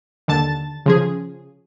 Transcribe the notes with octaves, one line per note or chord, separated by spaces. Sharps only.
D#2 D3 A5 A6
C#3 F3 G#4